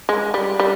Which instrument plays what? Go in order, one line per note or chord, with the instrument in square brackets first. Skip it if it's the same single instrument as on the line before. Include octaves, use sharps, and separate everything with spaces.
[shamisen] G#3
G3
G3